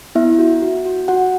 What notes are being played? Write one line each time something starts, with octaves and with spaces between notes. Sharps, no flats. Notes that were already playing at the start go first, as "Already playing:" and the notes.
B3 E4 E5
F#4
F#4
F#4
F#4 F#5